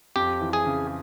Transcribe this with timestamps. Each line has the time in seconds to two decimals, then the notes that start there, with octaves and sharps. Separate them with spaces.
0.16 F2 G4
0.41 E3
0.53 G#4
0.66 C#3